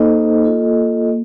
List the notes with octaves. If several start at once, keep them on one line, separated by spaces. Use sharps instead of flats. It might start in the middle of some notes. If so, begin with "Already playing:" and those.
Already playing: A#3 D#4 A4 C5 D#5
A#3 F4 A4 D#5
A#3